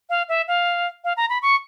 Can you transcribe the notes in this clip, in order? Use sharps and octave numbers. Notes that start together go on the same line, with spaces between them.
F5
E5
F5
F5
A#5
B5
C#6